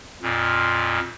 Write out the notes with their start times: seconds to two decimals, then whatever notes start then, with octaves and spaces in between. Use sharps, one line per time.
0.22 F2 A#2